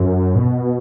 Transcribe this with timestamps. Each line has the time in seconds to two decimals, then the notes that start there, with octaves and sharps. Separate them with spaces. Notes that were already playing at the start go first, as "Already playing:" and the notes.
Already playing: F#2
0.36 B2